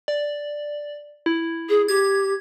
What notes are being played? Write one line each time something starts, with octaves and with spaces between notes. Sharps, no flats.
D5
E4
G#4
G4 G#6